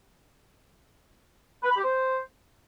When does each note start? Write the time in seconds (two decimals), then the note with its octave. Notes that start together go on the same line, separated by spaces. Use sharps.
1.63 B4
1.70 B5
1.77 G4
1.84 C5